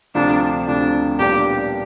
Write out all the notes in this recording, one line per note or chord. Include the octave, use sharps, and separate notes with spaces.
D2 C3 F3 D4
D2 C3 F3 D4
B1 A#2 G3 B3 D4 G4